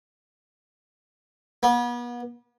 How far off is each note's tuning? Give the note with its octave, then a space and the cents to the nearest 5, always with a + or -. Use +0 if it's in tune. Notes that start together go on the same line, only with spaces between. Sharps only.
B3 -40